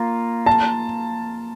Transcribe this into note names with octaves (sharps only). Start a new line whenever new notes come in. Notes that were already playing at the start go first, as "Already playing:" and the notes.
Already playing: A#3 F4
A5